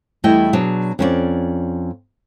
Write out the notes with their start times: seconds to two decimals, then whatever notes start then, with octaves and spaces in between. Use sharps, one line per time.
0.24 E2 G3 A3 E4 D#5 G5
0.53 B2 F#3 D4 G#4
0.99 F2 C#4 F4 D5